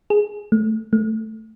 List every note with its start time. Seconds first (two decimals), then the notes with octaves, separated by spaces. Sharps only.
0.10 G#4
0.52 A3
0.93 A3